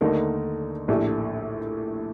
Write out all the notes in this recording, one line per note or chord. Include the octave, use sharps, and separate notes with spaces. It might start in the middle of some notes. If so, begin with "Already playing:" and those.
D#2 D3 A3 D#4 A#4
A#1 A2 A3 D4 G4